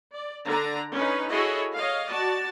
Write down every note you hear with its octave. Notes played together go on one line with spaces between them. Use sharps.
D5
D3 D4 A#5
C#4 D#4 B4
E4 F#4 G#4 A4 C#5 D#5
C#5 D#5 F5
F#4 D5 A5